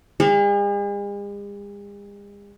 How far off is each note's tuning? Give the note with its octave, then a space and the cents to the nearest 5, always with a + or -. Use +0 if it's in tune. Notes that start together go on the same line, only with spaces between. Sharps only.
G#3 -45 G#4 -45